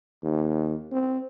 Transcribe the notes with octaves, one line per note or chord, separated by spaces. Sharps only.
D#2
C4